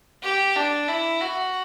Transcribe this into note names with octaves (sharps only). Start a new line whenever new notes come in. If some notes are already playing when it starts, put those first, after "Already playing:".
G4
D4
E4
F#4